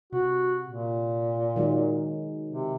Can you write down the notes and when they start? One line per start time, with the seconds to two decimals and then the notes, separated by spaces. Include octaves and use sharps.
0.13 C3 F#4
0.67 A#2
1.56 D#3 F#3 G#3
2.51 C3